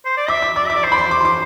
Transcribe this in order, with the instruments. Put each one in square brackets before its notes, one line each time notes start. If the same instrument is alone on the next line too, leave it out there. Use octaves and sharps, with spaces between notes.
[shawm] C5
D5
[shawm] E5 [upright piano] D6
[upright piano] D6
[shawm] D5 [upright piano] D6
[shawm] E5 [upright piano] D6
[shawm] D5
[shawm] C5 [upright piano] C6
[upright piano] B5
C6
D6
C6
D6